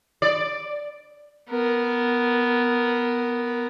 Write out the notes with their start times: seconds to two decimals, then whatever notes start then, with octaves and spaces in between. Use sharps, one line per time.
0.22 D5
1.50 B3 A#4